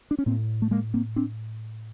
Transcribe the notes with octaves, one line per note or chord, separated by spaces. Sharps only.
D4
C#4
A2 A#3 C4
A3
G#3 A#3
A#3 C4
C4 D4